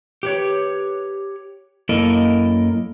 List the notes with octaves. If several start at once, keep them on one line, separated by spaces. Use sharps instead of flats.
G4 B4 C#5
F#2 A#3 E4 A4 A#4 D#5